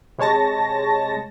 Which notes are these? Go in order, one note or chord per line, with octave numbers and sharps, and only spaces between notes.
C3 G#3 C#5 A5 A#6